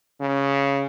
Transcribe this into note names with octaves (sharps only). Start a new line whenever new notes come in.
C#3